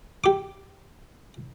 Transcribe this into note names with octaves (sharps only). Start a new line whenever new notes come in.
G4 D6